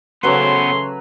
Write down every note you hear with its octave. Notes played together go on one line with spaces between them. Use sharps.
C#3 F#3 A3 B3 C#4 B4 C5 C6